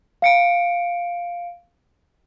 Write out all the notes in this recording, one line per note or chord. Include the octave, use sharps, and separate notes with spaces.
F5 C#7 D7